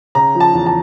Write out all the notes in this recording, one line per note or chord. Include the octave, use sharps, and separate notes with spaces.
C#3 A#5
F3
A5
E2
A5